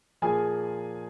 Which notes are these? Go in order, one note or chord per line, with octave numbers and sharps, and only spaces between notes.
A#2 F3 A#3 G#4 G#5